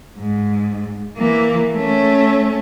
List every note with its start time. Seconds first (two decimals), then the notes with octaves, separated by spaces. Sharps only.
0.18 G#2
1.17 E3 A#3
1.74 A3 C#4